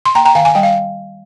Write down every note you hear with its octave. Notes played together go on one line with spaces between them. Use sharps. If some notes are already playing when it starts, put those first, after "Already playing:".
C6
A#3 G5 A#5
G5 A#5
D#3 F5 G#5
G#5
G3 G5
F5